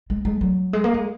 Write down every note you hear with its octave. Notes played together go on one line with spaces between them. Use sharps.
G#3
G#3
F#3
G#3
A#3
G#3